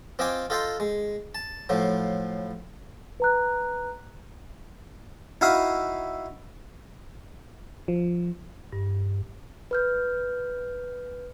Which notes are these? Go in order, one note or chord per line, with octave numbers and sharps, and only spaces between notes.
C4 F4 D#5 G5 G#5 D6
F4 A4 D#5 G5 A#5 C6
G#3
A5
A2 F3 F#3
B4 A#5 F#6
D#4 E4 F#4 F5 B5 D#6
F3
G2
B4 F6 G6